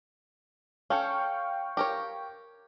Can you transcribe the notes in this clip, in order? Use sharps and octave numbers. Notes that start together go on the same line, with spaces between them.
C#4 A4 F5 G5 C#6
G4 A#4 C#5